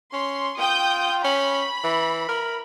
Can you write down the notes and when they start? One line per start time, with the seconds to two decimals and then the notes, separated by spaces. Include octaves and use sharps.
0.13 C#4 C6
0.58 F4 G5 D#6 G6
1.24 C#4 B5
1.84 E3
2.29 A#4